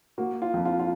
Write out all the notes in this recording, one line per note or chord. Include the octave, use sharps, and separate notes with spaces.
A#3 F#4
F4
F2
F4
F4